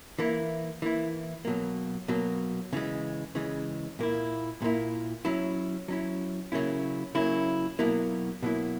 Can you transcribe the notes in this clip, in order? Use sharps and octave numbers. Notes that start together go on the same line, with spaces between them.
E3 A#3 E4
E3 A#3 E4
B2 F#3 A#3
B2 F#3 A#3
C#3 E3 G#3
C#3 E3 G#3
A#2 A#3 E4
A#2 A#3 E4
F#3 C#4 E4
F#3 C#4 E4
C#3 F#3 A#3 C#4 E4
C#3 F#3 A#3 C#4 E4
B2 F#3 A#3 E4
B2 F#3 A#3 E4